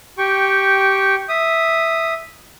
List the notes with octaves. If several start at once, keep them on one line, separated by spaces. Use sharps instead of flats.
G4 G5 C#6
E5 D#6